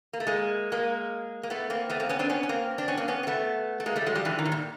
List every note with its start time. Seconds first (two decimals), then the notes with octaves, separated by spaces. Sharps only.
0.13 A#3
0.20 A3
0.27 G#3 A#3
0.72 G#3 A#3
1.43 A#3
1.50 A3 B3
1.70 A#3 C4
1.90 A3 B3
2.00 A#3 C4
2.09 B3 C#4
2.19 C4 D4
2.29 B3 C#4
2.43 C#4
2.49 A#3 C4
2.78 C4 D4
2.88 B3 C#4
2.97 A#3 C4
3.08 B3 C#4
3.23 C4
3.27 A3 B3
3.80 A3
3.86 G#3 A#3
3.96 G3 A3
4.06 F#3 G#3
4.15 F3 G3
4.25 D3 E3
4.39 D#3
4.45 A2
4.52 A#2